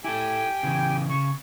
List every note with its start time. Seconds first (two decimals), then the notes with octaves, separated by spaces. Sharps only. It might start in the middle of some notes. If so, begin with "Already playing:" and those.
0.04 E4 G4 A4 G5 G#5
0.63 C#3 E3
1.10 C#3 C#6